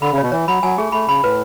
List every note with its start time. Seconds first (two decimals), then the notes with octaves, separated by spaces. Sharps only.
0.02 D3 B5
0.12 C#3
0.18 B2 C#5
0.32 E3 C#5
0.48 F#3 B5
0.63 F#3 G#5
0.78 A3 G#4
0.92 A3 B5
1.08 C#3 B5
1.23 A2 B4